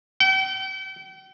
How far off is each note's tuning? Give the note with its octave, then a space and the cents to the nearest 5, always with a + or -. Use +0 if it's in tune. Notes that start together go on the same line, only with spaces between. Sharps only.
G5 -40